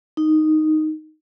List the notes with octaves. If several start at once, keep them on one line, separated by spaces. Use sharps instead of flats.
D#4